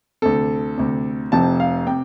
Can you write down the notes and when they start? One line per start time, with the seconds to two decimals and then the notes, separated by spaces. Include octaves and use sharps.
0.22 D2 C3 A4
0.78 D2 C3
1.32 F1 F2 C3 A5
1.60 F5
1.87 C3 G5